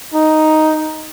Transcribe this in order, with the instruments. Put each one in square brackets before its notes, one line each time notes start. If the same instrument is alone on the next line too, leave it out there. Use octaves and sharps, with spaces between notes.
[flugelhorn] D#4